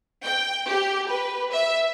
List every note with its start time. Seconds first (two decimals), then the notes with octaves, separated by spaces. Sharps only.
0.24 G5
0.69 G4
1.09 B4
1.52 E5